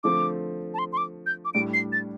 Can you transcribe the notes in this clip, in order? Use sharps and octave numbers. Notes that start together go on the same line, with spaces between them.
D3 F3 A3 C4 D6
A5
C6
C6
D6
G6
D6
A2 G3 D4 D7
C7
A6